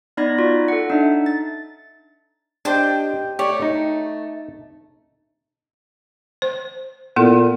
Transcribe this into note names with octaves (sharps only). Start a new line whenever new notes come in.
B3 D#4 D5 B5 G#6 A#6
F4 F#4 D5
A4 F#5
D4 D#4 E5
A6
D4 G4 C5 D#5 G5
A3 G4 C#5 D5
D#4
C5
A#2 B3 E4 A4